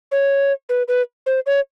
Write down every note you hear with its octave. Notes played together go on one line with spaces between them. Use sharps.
C#5
B4
B4
C5
C#5